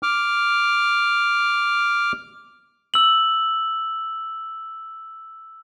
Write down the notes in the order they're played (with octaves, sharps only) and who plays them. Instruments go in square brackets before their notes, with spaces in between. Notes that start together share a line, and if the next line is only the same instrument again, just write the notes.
[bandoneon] D6 F6
[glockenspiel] E6 F#7